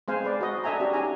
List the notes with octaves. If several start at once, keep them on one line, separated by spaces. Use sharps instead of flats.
G#3 C4 C5 F5 G#5
B4 D5
F#4 D#5
D4 A4 D#5 E5 G#5 A#5
C#4 D4 F#4 G4
D4 D#4 G4 G#4 G#5 A#5